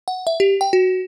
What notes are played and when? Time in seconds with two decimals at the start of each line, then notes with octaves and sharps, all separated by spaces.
0.08 F#5
0.27 E5
0.40 G4
0.61 G5
0.73 F#4